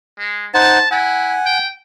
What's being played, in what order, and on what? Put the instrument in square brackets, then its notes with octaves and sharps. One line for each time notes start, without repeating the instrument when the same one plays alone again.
[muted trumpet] G#3
[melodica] D#4 C5 F#5 [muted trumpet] A5
[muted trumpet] E4 [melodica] F#5 G#5
[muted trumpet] G5